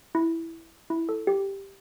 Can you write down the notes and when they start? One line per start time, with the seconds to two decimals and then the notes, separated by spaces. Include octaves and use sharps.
0.15 E4
0.90 E4
1.09 A4
1.27 G4